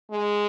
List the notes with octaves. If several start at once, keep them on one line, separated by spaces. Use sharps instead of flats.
G#3